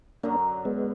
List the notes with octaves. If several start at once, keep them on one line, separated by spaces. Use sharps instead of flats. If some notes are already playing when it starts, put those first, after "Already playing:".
F#2 D3 F#3 A#3 D4
G#3 B3